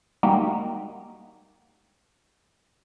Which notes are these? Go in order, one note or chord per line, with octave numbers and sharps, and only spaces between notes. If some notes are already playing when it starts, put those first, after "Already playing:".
G3 G#3 A#3 D#4 F#4 G4